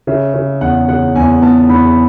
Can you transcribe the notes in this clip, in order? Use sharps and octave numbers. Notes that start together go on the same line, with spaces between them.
C#3 E5
C#3
E2 F#5
C#3 F#5
E2 G#5
B3 A5
E2 B5